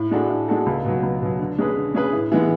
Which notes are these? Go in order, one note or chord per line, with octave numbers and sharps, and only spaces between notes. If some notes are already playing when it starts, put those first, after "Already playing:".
Already playing: A2
G#3 D4 F#4 A4
A2
G#3 D4 F#4 A4
C#2
B2 F#3
C#2
B2 F#3
D3
G#3 C#4 G#4 B4
D3
G#3 C#4 G#4 B4
A2
E3 G#3 B3